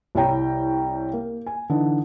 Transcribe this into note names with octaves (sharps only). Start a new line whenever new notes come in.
C2 E4 C#5 G5 A#5
A#3
G#5
D3 E3 D#4